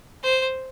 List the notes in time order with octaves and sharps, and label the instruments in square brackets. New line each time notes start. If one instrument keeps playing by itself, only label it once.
[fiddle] C5